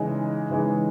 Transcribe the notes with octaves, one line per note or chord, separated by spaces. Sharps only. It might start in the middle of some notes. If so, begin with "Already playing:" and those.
Already playing: C#3 E3 G#3 D#4
C#3 E3 G#3 D#4